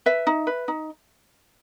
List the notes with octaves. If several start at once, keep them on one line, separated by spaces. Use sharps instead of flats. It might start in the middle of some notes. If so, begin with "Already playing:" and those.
B4 E5
D#4
B4
D#4